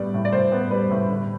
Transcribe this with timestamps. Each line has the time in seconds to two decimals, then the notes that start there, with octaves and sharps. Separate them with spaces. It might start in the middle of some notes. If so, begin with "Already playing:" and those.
Already playing: A2 G3 B3 D5
0.14 A2
0.25 D5
0.33 A2 C5
0.52 B3
0.71 G3 B4
0.91 A2
1.10 D3